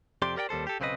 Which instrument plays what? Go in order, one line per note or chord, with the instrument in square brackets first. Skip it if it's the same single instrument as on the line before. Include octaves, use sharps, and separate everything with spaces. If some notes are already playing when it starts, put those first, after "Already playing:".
[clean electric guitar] F2 C3 G4 D5 C6
G4 A#4 D5 F#5 G5
D#2 G3 A4 C5
G4 A4
B1 C#3 C4 G4 B4 D#5